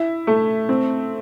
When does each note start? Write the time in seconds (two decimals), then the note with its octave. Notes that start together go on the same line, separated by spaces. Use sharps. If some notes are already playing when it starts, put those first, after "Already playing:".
Already playing: E4
0.27 A3
0.69 C4